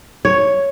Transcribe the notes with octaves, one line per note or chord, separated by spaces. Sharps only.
C#5